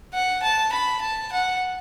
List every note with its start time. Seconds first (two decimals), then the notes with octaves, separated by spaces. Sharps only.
0.14 F#5
0.42 A5
0.72 B5
1.01 A5
1.32 F#5